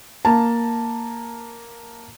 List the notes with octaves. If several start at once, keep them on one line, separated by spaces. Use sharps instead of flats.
A#3 A5